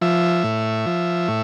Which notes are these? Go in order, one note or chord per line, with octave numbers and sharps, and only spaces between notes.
F3 E5
A2
F3
A2